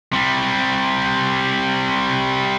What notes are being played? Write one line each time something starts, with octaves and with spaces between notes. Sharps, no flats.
C3 G3